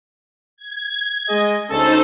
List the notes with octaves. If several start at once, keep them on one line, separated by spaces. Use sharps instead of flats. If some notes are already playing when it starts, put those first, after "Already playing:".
G#6
G#3 G#4 D#5
D2 C#4 D#4 A4 C5